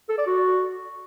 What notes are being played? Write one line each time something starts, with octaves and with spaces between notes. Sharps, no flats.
A4
D5
F#4